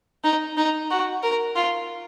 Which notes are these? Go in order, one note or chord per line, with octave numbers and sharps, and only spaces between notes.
D#4
D#4
F#4
A#4
F4